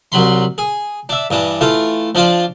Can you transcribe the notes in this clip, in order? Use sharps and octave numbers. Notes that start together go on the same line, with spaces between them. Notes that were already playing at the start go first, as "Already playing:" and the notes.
C2 F#3 B5 C6
G#4
D4 E5
G2 E3 D4 D#6
E3 A3 F4
F3 D4 F4 D5